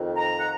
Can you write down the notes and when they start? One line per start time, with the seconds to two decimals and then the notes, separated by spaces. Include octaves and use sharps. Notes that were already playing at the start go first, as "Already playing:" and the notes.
Already playing: F2 D#3
0.16 A#5
0.40 F#5